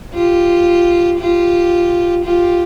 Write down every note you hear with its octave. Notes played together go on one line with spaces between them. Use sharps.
F4 G4
F4 G4
F4 G4